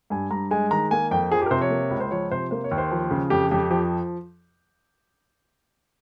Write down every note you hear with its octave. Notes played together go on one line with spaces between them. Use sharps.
G2 G#5
G2 A#5
G#3 G#5
D#3 A#5
A#3 G#5
F2 G5
F3 G#4
G4
A#4
C3 C5
C#5
A#3
C#2
C5
F3 C#5
C3 C5
A#3 C5
C#5
D#2
C5
F3
C#3
F2 G4
F2 G4
F3 G4